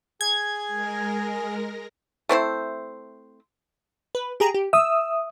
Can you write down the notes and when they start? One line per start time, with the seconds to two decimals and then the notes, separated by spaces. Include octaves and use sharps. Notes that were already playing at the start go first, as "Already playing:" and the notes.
0.21 G#4 G#6
0.67 G#3 A#4 A#6
2.29 A3 C4 E4 C5
4.15 B4
4.40 G4 G#4 A#5
4.54 G4
4.73 E5 D#6 E6